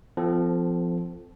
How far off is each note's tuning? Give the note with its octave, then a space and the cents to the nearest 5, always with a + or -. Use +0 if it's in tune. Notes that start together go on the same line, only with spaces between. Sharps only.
F3 -10 C4 -35 A4 +0